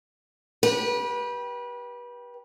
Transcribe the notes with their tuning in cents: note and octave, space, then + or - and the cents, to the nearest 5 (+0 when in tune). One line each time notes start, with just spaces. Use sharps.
G4 +0 B4 -30